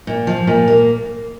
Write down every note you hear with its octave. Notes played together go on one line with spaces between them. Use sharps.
A#2
F3
A#2
A#3